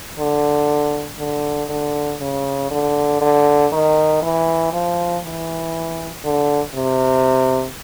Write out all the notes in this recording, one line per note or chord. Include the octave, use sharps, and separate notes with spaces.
D3
D3
D3
C#3
D3
D3
D#3
E3
F3
E3
D3
C3